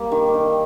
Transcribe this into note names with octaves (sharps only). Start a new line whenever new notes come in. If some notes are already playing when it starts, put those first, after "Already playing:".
Already playing: G3 A#3
D#3
D#3